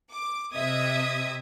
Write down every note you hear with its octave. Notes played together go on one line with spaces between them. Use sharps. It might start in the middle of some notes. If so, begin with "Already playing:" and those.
D6
C3 D#5 E5 D#6 G#6